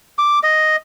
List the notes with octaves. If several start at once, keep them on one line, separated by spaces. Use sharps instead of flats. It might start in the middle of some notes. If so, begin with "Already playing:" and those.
D6
D#5